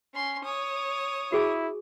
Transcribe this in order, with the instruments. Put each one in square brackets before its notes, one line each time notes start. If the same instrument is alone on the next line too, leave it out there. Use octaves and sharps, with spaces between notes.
[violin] C#4 C6
C#5 D#6
[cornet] E4 [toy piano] F#4 G#4 G#5